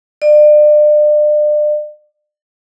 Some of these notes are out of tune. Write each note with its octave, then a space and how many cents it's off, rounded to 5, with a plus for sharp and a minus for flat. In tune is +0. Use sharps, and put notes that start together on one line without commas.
D5 +35